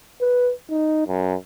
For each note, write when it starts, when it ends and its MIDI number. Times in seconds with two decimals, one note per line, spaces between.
0.21 0.51 71
0.70 1.06 63
1.08 1.34 42